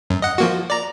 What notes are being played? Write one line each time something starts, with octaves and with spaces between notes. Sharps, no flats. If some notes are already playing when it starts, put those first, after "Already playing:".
F#2
D#5 F#5
F3 A#3 F#4
D5 A#5